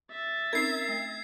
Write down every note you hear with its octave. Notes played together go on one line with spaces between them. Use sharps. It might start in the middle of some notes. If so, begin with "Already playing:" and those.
E5 A6
C4 C#4 D#4 A#4 G#6 C7
A3